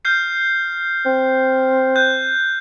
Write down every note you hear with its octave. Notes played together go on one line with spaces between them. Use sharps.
F6 G6 C7
C4
F#6 G6